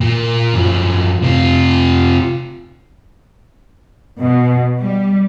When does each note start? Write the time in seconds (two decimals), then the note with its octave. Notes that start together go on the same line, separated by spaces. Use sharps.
0.01 A#2 A#3
0.54 F#2 F3
1.22 C3 F4
4.19 B2
4.79 G3